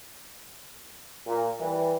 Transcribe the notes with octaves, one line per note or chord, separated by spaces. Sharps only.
A#2
E3 G3